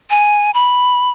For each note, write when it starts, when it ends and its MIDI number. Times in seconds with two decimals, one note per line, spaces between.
0.10 0.51 80
0.54 1.10 83